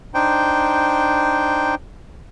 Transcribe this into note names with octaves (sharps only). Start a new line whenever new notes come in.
D4 D#4 C5 G5